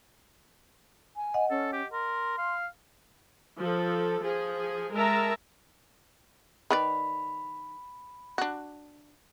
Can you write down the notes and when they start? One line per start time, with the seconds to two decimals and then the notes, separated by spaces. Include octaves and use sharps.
1.16 G#5
1.34 D#5 F#5
1.50 C#4 A4
1.73 G4
1.92 A#4 C6
2.38 F5
3.60 F3 A4
4.23 F3 G#4
4.94 G#3 A#4 E5 A5 A#5
6.70 D#3 B4 D5 B5
8.38 D4 F#4